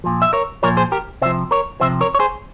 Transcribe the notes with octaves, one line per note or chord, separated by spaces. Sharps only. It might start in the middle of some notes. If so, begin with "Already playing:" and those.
A#2 F3
E5
A#4 C#5
A#2 F3 A#4 C#5
G#4 C5
G4 A#4
C3 F3 C5 E5
A#4 C#5
C3 F3 C5 E5
A#4 C#5
C#5
G#4 C5